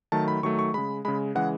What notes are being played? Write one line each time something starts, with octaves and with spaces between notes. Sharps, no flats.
D#3 F#3 A3 A5
B5
D#3 F#3 A3 C#6
C#6
C#3 G#3 B5
C#3 G#3 B5
C#3 E3 G#3 F#5